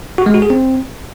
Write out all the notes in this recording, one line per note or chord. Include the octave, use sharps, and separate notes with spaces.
F#4
G#3
F#4
G#4
C4